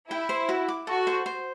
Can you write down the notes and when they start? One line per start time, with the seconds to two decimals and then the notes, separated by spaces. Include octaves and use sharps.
0.10 E4 G5
0.29 C5
0.49 F#4
0.68 D6
0.87 F#4 A4
1.07 C5
1.26 C5